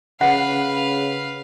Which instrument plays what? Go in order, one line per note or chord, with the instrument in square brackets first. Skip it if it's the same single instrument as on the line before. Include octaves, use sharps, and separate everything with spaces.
[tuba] C#3 [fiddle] B4 F5 [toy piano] F#5